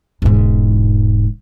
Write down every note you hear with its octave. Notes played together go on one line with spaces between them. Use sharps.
E1 G#2